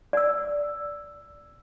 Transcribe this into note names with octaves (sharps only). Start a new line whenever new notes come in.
D5 E6